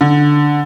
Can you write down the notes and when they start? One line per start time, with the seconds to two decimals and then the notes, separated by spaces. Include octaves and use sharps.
0.01 D3